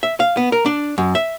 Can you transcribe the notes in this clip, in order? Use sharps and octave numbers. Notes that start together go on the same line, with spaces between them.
E5
F5
B3
A#4
D4
F#2
E5